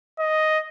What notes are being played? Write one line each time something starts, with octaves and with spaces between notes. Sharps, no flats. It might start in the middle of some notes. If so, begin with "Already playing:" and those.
D#5